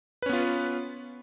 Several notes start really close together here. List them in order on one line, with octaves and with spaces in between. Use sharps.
B4 C#4 B3 F4